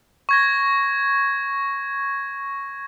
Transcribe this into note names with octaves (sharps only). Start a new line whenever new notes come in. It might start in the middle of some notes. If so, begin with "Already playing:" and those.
C#6 G#6 A#6